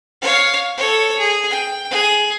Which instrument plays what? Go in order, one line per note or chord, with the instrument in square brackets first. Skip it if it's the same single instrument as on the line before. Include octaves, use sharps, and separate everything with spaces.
[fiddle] C#5 F5
A4 C#5
G#4
G5
G#4